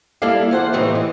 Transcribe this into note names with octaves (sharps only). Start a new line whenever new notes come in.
G3 A#3 E4 A4 D5 F5
E2 C5 F#5
D#2 A2 C3 E3 C4 D#4
E3